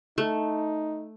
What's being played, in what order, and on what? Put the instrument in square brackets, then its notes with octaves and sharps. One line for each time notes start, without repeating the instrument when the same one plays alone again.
[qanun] A3 [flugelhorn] D#4